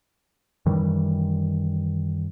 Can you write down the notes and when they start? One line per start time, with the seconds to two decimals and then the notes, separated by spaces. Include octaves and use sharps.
0.66 F#2 D#3 E3 G3